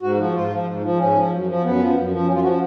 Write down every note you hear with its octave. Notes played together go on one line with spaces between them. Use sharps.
G#2 F#4
F3
G#2 F4
F3
G#2
F3
G#2 C#4
F3
F#2
F3
F#2 B3
F3
F#2
F3
F#2 C#4
F4
F3 F#4